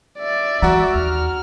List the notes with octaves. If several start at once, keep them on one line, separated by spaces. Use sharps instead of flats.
D5 E5
E3 G#3 F#4 F#5 A#5
D#2 F6